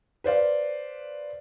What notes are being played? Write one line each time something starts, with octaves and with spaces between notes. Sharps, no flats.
B4 C5 D5 F5